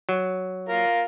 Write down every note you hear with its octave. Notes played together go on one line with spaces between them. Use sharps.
F#3
F4 A#4